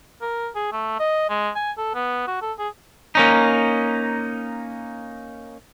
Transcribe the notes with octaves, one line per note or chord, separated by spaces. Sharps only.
A#4
G#4
A3
D#5
G#3
G#5
A4
B3
F#4
A4
G#4
A#3 C#4 D#4